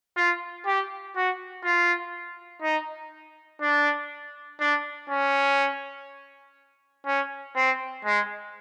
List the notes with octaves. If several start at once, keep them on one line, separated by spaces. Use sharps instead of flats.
F4
G4
F#4
F4
D#4
D4
D4
C#4
C#4
C4
G#3